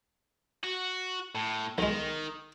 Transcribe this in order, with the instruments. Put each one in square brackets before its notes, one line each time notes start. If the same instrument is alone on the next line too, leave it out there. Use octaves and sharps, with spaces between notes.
[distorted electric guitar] F#4
A2
[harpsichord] B1 G#3 [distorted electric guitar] D#3